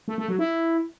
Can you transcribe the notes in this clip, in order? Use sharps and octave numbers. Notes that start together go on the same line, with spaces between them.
A3
A3
F#3
E4